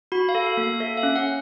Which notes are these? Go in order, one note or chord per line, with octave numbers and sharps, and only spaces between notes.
F#4 B5
F5
A4
F5
A#3
F5
A4 E5
F5
C#4
F#5